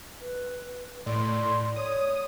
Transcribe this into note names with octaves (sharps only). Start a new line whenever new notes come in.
B4
A2 D5 C6
C#5 D#6